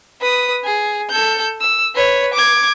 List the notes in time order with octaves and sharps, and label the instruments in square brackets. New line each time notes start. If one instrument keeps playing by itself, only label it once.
[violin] B4 D#6
G#4
A4 G6
E6
B4 C#5
D6 G#6